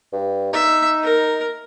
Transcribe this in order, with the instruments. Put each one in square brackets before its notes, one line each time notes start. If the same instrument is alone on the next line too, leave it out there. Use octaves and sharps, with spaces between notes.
[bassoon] G2
[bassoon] D#4 [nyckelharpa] E5
[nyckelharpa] A#4